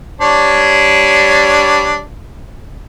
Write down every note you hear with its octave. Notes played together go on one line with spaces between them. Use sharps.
G3 D4 C#5